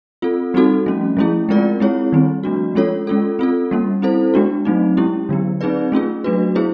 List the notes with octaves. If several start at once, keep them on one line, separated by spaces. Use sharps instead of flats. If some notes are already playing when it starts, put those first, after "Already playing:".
C4 F4 A4
G3 C4 D#4 F#4 A4
F3 A3 C#4
F3 A3 C#4 E4 G#4
G#3 C4 F4 A#4 D5
G#3 C4 E4 G#4 C#5
D#3 G3 C4
F3 A3 D4 F#4
G#3 C#4 F4 A4 C#5
G#3 C#4 F4 A4
C4 F4 A4
G3 A#3 C#4
C4 E4 A4 C5
G#3 B3 D4 F#4
F#3 A3 C4 D#4
G#3 C#4 E4 G4
D3 F#3 B3
C4 D#4 G#4 B4 D5
A3 C#4 F4 G#4
F#3 A3 D4 F#4 B4
B3 E4 G#4 C5